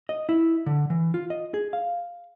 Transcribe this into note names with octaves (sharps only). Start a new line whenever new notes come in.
D#5
E4
D3
E3
F4
D#5
G#4
F5